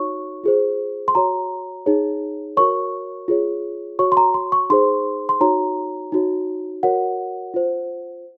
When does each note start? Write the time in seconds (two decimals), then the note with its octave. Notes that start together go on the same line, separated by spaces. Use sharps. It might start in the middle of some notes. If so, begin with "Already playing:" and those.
Already playing: D#4 F#4 C#5 C#6
0.44 F4 G#4 C5
1.08 C6
1.15 F#4 C#5 A#5
1.86 D#4 G#4 C#5
2.57 F#4 A#4 C#5 C#6
3.28 F4 G#4 C#5
3.99 F#4 C#5 C#6
4.12 C6
4.17 A#5
4.34 C6
4.52 C#6
4.70 D#4 G#4 C5 C6
5.29 C6
5.41 D#4 F#4 C#5 A#5
6.12 D#4 F#4 C#5
6.83 F#4 A#4 C#5 F#5
7.54 F4 C5